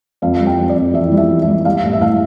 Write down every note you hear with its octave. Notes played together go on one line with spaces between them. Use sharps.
F2 F5
G3
G5
F2
D5
F2
E3 E5
G3
E5
E3
E5
G3
G3 F5
A2
E5
A2 F5